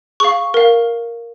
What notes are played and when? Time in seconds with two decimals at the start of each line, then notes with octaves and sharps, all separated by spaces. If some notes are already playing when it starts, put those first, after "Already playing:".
0.20 G#4 F5 C#6
0.54 A#4 F5